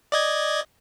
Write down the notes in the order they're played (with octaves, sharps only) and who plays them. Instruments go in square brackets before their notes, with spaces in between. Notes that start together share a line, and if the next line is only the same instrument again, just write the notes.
[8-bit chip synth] D5 D#5 G#6